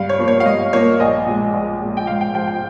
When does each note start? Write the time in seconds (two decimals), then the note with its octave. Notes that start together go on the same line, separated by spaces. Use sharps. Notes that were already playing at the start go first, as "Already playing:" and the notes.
Already playing: G2 F5
0.09 C#5
0.19 F3 A#3
0.28 C#5
0.40 F5
0.46 G2 D#5
0.73 F3 A#3 C#5
1.00 A#1 D#5
1.26 A#2 G#3
1.54 A#1
1.80 A#2 G#3
1.97 G5
2.07 G#2 F5
2.21 G5
2.34 F3 G#3 G5
2.48 G5